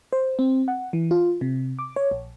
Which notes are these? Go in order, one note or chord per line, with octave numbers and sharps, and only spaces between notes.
C5
C4
F#5
E3
F4
C3
D6
C#5
A#1